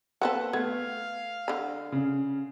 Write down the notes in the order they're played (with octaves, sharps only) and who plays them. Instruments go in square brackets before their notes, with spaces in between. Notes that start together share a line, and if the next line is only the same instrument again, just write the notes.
[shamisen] A#3 C4 A4 [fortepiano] B4 F#5
[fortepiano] A3 [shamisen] B3 [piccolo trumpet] F5 [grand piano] G#6
[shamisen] D3 B5
[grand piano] C#3